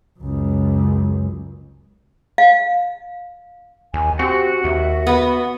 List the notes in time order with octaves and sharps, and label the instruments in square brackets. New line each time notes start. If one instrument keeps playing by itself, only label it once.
[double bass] C#2 F#2
[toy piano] F5
[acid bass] D#2 [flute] G#5
[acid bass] C4 [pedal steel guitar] F#4 [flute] G4
[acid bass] D#2 [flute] E5
[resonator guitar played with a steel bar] B3